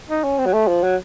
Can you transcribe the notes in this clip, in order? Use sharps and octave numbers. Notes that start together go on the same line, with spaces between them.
D#4
C#4
C4
F#3
A3
F3
F#3